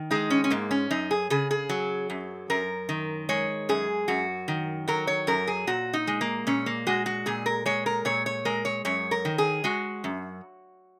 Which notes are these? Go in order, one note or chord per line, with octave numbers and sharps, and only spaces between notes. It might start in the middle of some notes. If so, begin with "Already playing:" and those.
Already playing: D#3
G#3 D#4
C#4
C#4
G#2 A#3
C#4
F#2 D#4
G#4
C#3 G#4
G#4
F#3
F#2
F#2 A#4
D#3
G#3 C#5
F#2 G#4
F#2 F#4
D#3
F#3 A#4
C#5
F#2 A#4
G#4
A#2 F#4
D#4
G#3
A#3
A#2 C#4
A#3
G#3 F#4
F#4
A#2 G#4
A#4
G#3 C#5
A#4
A#2 C#5
C#5
G#3 A#4
C#5
F#2 C#5
A#4
D#3
G#4
G#3 F#4
F#2